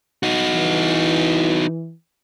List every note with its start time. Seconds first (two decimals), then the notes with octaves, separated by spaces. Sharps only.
0.23 D#4 F#4
0.53 E3